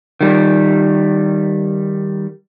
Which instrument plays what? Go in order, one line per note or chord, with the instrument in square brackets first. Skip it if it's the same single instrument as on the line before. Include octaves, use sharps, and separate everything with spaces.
[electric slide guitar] D#3 G3